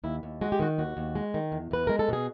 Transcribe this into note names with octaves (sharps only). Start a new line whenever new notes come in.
D#2 E4
D#2
G#3 F#4
G4
D#3 F#4
D#2 F#4
D#2
G#3
D#3
E2
E2 B4
G#3 A#4
A4
B2 G#4